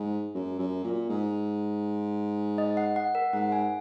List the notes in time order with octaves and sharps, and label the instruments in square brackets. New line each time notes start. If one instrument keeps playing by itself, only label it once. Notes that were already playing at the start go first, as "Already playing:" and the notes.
Already playing: [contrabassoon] G#2
F#2
F#2
A#2
G#2
[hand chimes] D#5
F#5
F#5
A#4
[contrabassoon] G#2 [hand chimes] F#5
[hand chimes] G#5